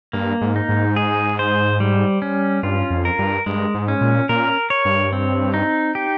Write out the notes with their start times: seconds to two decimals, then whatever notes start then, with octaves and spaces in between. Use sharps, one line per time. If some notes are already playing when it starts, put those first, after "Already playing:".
0.13 G2 A#3
0.41 G#2
0.56 D#4
0.69 G#2
0.96 G#4
1.39 C5
1.80 G3
2.22 C#4
2.63 G2 F4
2.90 F2
3.05 A#4
3.19 G2
3.46 G2 G#3
3.74 G#2
3.88 C#4
4.01 A#2
4.29 A#2 A#4
4.70 C#5
4.85 G2
5.13 C4
5.54 D#4
5.95 G4